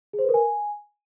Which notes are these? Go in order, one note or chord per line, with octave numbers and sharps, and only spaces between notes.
G#4
C5
B4
A#4
G#5